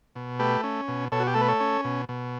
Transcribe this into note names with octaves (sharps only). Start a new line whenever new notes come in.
B2
A3 G4 B4
C#4
B2
B2 A4 C#5
F#4
G4
A3 A4
B4
A4 C#5
C#4
B2
B2